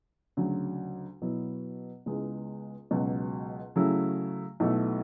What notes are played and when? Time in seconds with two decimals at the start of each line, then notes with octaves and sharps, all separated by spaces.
0.37 D2 C#3 F#3
1.22 B2 F#3 B3 E4
2.06 C#2 C#3 G#3 B3 E4
2.91 C#2 B2 F#3
3.76 C#3 F#3 A3 E4
4.60 B1 B2 A3 E4